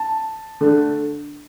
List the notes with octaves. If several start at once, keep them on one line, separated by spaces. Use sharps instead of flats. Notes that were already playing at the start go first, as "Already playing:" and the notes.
Already playing: A5
D3 A3